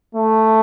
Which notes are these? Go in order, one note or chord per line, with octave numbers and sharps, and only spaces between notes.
A3